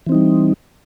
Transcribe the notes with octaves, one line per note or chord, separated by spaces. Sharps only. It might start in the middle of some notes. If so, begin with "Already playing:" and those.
E3 G3 C4 D#4